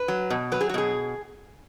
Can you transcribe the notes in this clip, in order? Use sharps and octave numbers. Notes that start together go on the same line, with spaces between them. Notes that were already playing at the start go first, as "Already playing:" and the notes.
Already playing: B4
F#3
B2
F#3 B4
G#4
F#4
B2 G#4